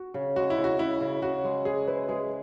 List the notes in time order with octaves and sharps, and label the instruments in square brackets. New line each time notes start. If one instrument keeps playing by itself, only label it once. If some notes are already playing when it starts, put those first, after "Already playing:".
Already playing: [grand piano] F#4
[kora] C#3
[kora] G#3 [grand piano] F#4
[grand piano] E4
[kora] C#3
[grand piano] F#4
[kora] C#3 [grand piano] E4
[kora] C#3
[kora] C#3 [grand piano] F#4
[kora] G#3
[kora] G#3 [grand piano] G#4
[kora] E4 [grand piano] B4
[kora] G#3 [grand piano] G#4